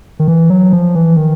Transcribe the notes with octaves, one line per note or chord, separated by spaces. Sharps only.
D#3
E3
F#3
F3
E3
D#3